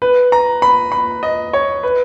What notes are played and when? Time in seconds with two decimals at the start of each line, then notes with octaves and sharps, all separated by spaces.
0.02 B4
0.32 A#5
0.62 B5
0.92 B5
1.23 D#5
1.53 C#5
1.83 B4